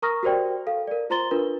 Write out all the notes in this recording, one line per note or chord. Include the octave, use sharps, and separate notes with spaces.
A#4 A#5 C#6 D#6 F6 A#6
F#4 G4 A#4 C5 D5 G5
A4 F5
A#4 D5
F4 C5 A#5 C6 A6 G7
D4 F4 A#4 B4